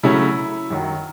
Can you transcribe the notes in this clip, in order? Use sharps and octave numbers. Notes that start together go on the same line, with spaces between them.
C#3 F#3 A3 C#4 E4
F#2 D#3 F#3